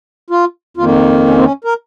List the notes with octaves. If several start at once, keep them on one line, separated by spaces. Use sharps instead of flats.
F4
F2 D#3 A#3 F4
C#4
C4
C#4
A#4